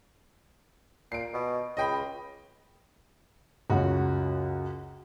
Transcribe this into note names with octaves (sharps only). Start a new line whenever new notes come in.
A#2 C7 D7
B2
C#2 D#5 G5 B5
C#2 F#2 F#4